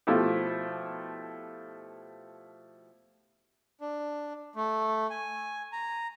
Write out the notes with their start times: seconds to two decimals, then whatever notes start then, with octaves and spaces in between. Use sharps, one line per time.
0.07 B2 F3 A3 E4 F4 G4
3.81 D4
4.56 A3
5.10 G#5
5.73 A#5